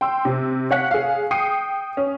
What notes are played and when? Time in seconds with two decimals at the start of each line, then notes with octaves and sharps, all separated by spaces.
0.01 G5 C6 E6
0.25 C3 C4
0.71 C#5 F5 F#5 F#6 B6 C#7
0.91 G#4 F5
1.31 G5 D#6 C7 C#7 D#7
1.97 C#4